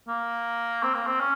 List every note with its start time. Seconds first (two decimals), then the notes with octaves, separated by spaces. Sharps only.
0.08 A#3
0.83 C4
0.94 A#3
1.07 C4
1.20 C#4